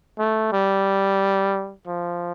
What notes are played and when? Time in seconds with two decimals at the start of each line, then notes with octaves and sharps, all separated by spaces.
0.19 A3
0.52 G3
1.87 F3